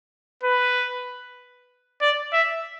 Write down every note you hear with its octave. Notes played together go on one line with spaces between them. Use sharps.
B4
D5
E5